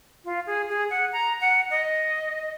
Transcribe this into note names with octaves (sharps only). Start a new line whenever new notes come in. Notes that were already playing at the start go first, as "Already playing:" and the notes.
F4
G#4
G#4
F#5
A#5
F#5
D#5